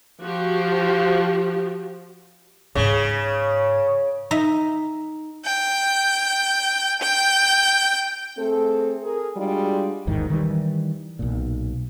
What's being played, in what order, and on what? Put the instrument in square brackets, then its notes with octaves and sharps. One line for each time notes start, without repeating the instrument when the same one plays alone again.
[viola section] F3 F#4 G4
[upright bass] G#2 C#4 [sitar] C#3
[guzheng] D#4 D#5 E5
[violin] G5
G5
[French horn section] A3 C4 G#4 A4
G#4 A#4
G3 G#3 D4 F4 F#4
[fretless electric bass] A1 E2 G#2 D#3
D#3 E3 G3
B1 A#2